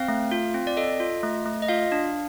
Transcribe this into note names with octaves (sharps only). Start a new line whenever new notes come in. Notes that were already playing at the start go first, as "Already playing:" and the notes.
Already playing: C4 F5
A3
F4
C4
D5
A4 D#5
F4
A3
A3
D#5
F4 F5
D4